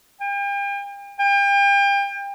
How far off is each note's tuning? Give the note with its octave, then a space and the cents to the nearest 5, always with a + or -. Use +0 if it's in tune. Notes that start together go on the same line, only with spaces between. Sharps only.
G5 +40
G5 +35